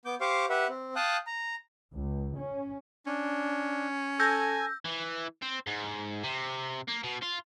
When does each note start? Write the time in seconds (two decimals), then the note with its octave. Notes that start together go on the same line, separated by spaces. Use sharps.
0.05 B3 D6 G6
0.21 G4 C5 F5 C#6 D6
0.50 G4 B4 E5 F#5
0.69 C4
0.96 F5 G5 A5 D#6 F#6
1.27 A#5
1.95 C#2
2.39 C#4
3.07 C#4 D4
4.20 A4 G#5 E6 G6 A#6
4.85 E3
5.42 C4
5.67 G#2
6.24 C3
6.88 A#3
7.04 B2
7.22 F4